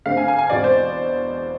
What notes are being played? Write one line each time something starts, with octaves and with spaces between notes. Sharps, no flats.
D3 A3 C4 F5
G#5
G#5
G#5
E2 B2 G#3 C4 D5
C5